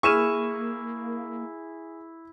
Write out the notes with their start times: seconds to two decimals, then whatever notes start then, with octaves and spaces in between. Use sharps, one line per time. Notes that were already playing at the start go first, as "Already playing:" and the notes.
0.03 A#3 E4 G#4 C#6 F6 D#7 E7